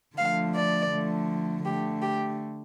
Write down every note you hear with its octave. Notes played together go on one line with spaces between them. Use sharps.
D3 F3 A3 F5
D5
D3 F3 A3
D3 A3 G4
G4